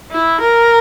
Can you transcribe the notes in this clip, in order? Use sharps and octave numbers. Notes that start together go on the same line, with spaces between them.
E4
A#4